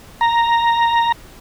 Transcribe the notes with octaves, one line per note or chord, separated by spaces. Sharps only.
A#5